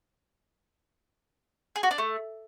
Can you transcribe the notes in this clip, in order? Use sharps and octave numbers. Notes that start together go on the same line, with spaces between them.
G#4
F#4
D4
A3